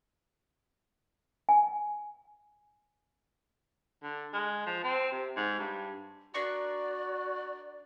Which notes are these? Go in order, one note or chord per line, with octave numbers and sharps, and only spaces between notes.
G#5
D3
G#3
F3
C4
C3
G#2
G2
D4 F#4 A#4 D5 C#6